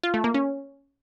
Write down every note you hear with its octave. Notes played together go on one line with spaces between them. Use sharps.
F4
A3
A#3
C#4